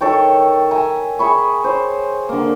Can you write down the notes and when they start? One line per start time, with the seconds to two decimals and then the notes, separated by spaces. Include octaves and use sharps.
0.01 D#3 A4 C#5 G5
0.71 E5 G#5 A#5
1.19 G#4 E5 B5 C#6
1.64 C5 C#5
2.29 D3 A#3